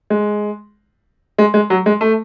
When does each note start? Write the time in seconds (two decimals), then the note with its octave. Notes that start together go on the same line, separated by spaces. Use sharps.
0.10 G#3
1.38 G#3
1.54 G#3
1.70 F#3
1.86 G#3
2.01 A3